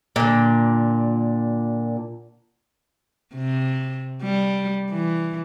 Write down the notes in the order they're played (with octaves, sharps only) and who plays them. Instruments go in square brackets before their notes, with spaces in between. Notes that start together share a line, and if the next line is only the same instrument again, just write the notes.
[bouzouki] A#2 D3
[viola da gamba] C3
G3
E3